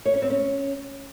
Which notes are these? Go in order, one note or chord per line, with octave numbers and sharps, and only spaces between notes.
C#5
C#4
C4
C#4